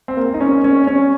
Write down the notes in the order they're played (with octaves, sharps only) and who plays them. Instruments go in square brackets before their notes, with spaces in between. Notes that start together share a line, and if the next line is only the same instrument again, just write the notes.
[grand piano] C4
A#3
D#4
C#4
C#4
C#4